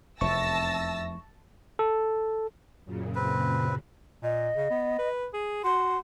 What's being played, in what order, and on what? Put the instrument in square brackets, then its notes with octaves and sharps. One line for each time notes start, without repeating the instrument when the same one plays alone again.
[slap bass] F1 E2 C3 [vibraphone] E5 [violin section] A5 E6 A#6 [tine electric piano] C#6
[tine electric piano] A4
[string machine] F#2 A#2 C#3
[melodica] C4 B4
[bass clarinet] A#2 [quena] D#5
[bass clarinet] C#3
B3
B4
G#4
[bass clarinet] F#4 [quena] C6